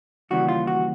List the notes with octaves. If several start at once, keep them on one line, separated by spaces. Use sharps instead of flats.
D#2 C#3 E3 G3 F#4
F4
F#4